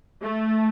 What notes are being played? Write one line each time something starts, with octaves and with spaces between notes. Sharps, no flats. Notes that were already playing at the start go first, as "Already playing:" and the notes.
A3